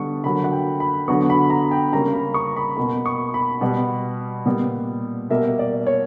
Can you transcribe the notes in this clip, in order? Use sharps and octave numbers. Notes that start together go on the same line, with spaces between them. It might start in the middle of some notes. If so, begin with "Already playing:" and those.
Already playing: D3 G3 B3 C#6
D3 F#3 A#3 B5
F#5
G5
B5
D3 F#3 B3 C#6
B5
A#5
G5
C#3 G3 A#3 A#5
B5
C#6
B5
B2 A#3 B5
C#6
B5
B2 G3 B3
A#2 G3 B3
B2 G3 A#3 E5
D5
C#5